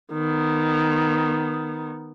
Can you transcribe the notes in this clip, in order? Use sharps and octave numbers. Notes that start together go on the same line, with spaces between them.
D#3 B3